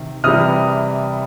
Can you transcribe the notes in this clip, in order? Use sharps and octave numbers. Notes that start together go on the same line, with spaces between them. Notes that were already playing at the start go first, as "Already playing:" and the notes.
Already playing: C3 D#3
C3 E3 G3 D#6 F6